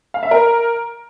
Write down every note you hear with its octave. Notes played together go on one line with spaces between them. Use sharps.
F5
E5
A#4